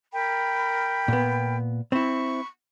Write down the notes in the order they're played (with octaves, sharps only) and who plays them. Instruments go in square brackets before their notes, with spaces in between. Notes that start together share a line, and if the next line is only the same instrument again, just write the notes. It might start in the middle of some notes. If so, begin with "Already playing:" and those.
[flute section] A#4 G5 B5
[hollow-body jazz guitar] A#2 B3
[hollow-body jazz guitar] C4 E4 [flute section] B5 C#6